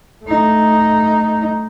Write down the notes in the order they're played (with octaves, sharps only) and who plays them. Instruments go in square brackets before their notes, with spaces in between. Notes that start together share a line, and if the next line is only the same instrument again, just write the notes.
[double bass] A3 D#4